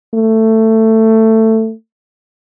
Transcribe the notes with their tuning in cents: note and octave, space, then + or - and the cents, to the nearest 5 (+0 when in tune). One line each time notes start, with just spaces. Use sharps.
A3 +15